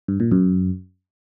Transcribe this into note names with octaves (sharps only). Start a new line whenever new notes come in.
G2
A#2
F#2